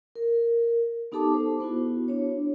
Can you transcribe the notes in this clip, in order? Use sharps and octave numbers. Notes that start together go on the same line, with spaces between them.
A#4
B3 D#4 G4 A4 A5 D6
C5
B3 E4 F#4
D4 C#5